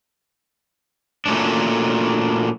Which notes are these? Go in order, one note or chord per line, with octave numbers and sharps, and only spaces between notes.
A#2 F#3 A3 C#4 D4